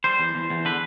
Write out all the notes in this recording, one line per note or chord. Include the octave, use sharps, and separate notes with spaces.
G3 C5
E2
E2
E2
D3 B4